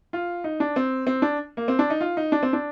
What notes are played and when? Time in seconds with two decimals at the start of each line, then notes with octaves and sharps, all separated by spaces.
0.13 F4
0.44 D#4
0.60 D4
0.76 C4
1.07 C4
1.22 D4
1.57 A#3
1.68 C4
1.79 D4
1.90 D#4
2.01 F4
2.17 D#4
2.32 D4
2.43 C4
2.53 D4